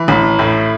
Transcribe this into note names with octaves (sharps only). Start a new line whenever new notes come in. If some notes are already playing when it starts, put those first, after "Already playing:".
Already playing: E3 B5
A1
A2